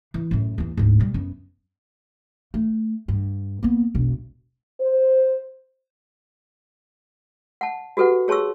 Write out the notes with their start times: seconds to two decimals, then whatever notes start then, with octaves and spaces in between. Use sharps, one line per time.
0.14 E3
0.31 F#2 A2
0.58 D#2 E3
0.77 D1 G#2
0.99 B2 G3
1.14 F#2 B3
2.54 A3
3.08 G2
3.63 A#3 B3
3.95 E1 B1
4.81 C5
7.61 F#5 A5
7.97 F#4 G4 A4 B4 F#5
8.28 G#4 C#5 A5 C6 C#6 E6